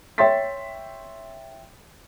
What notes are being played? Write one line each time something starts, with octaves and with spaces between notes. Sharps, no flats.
C#5 E5 G5 C6 A6 B6